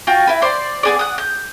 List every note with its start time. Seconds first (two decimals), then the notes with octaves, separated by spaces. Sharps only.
0.07 F4 F#4 G5
0.27 E4 B4
0.42 C5 D5 C6
0.83 B3 G#4 D5
0.99 F#5 D#6
1.18 G6